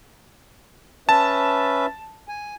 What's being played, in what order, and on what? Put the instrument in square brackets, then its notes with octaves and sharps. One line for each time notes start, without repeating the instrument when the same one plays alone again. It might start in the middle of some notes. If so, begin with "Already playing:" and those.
[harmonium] C#4 B4 E5 [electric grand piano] A5
[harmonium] G#5